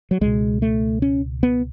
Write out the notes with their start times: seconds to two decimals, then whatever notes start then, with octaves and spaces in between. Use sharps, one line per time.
0.11 F#3
0.21 C#2 B2 G#3
0.62 A3
1.02 C#4
1.43 B3